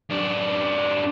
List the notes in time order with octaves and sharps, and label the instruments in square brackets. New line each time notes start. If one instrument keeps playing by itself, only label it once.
[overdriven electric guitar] F#2 D4